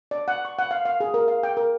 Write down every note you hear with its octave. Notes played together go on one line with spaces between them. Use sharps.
D5
F#5
C#6
F#5
F5
F5
G#4
A#4
F5
G5
A#4